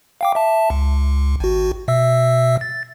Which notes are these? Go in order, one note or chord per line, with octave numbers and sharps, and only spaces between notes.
F5 G5 D6
E5 A5
C#2
G#1 F#4
B2 E5 E6
A6